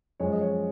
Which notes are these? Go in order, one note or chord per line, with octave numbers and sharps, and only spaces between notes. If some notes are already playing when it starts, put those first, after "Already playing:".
F#2 F3 G#3 C#5
D#5
C#5